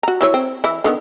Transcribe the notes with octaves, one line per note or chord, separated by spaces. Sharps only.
F#4 A#5
F#3 E4 C#5
C4
E3 E4
D3 D#3 B3